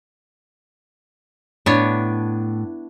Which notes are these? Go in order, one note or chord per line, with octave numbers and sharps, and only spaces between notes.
A2 B3 D4 C#5